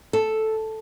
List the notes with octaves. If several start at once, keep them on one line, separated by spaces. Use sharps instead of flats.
A4